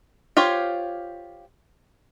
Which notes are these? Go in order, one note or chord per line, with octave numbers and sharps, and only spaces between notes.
F4 G4 C5 C#5